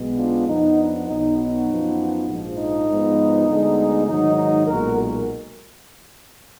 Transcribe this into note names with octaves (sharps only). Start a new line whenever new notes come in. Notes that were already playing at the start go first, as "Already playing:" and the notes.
Already playing: B1 B2 G#3 B3
D4 F4
F2 F3 B3 D#4
D4
B1 B2 F#3 B3 D#4
D#4 F#4
F#2 F3 B3
A#1 G#2 F3
D#4
G#2 F3 B3
D2 D3 G#3 B3
G#2 D#3 F#3 D#4
D#4
B1 A#2 G#3 F#4 A#4
F#4 A#4